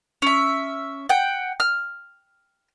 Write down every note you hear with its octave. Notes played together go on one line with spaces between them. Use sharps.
C#4 E5
F#5 G5
F6